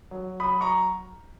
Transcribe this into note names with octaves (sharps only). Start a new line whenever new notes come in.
F#3
F#3 B5 D#6
A#5 C#6